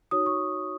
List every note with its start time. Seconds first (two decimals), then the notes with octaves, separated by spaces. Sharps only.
0.11 D#4 F#4 C#5 D#6
0.26 C#6